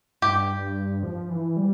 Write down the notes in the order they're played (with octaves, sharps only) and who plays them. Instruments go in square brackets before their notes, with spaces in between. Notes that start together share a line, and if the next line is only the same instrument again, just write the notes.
[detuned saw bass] G2 [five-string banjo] G4
[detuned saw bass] F3
E3
G3